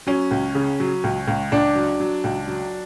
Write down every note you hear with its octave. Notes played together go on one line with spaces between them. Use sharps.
F#3 C#4
C#2
C#3
F#3
C#2
C#2
C#2 D4
F#3
F#3
C#2
F#3